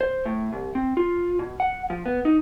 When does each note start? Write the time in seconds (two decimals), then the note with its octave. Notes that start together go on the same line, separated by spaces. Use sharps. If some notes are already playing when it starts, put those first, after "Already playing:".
0.01 C5
0.26 A2
0.53 C2
0.75 C4
0.97 F4
1.39 B2
1.60 F#5
1.90 F3
2.06 B3
2.25 D#4